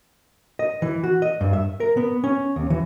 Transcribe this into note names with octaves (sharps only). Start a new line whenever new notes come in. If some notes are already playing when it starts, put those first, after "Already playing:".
D#5
E3
F#4
D#5
G2
E5
A#4
B3
C#4
D#2
E3